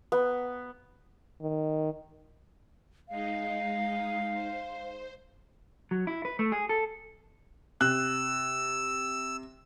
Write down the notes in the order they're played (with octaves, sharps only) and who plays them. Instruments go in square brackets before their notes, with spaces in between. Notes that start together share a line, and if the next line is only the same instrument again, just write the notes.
[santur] B3
[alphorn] D#3
[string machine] G#3 D#4 [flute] F5
[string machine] C5
[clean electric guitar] F#3
E4
B4
A3
G#4
A4
[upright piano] C3 [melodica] E6 [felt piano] F#6